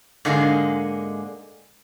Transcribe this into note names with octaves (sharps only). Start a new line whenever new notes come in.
G#2 D3 G#3 A#3